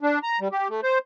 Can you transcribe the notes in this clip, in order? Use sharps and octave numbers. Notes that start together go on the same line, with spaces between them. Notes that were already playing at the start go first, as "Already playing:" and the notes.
D4
A#5
G3
G4
A3
C5